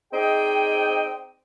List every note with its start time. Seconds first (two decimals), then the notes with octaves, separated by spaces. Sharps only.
0.13 C4 D#4 G#4 D5 D#5 G5